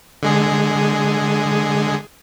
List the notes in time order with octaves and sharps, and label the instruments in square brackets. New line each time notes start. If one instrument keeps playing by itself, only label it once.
[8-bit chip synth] D3 G#3 G#4